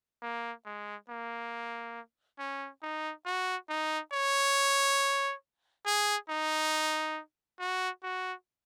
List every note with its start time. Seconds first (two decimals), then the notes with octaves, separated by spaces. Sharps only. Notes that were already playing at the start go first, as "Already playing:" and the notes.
0.22 A#3
0.66 G#3
1.09 A#3
2.39 C#4
2.82 D#4
3.26 F#4
3.69 D#4
4.12 C#5
5.86 G#4
6.30 D#4
7.59 F#4
8.03 F#4